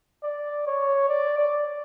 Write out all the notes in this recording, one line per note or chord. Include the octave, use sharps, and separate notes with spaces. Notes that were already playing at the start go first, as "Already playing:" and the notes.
D5
C#5
D5
D5